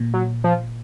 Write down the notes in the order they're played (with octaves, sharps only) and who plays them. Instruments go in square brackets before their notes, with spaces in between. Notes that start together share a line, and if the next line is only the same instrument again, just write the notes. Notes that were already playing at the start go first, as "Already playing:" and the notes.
Already playing: [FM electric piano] A#2
[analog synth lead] F#3
F3